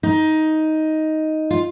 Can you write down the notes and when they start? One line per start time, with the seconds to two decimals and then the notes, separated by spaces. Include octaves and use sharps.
0.03 D#4
1.51 F4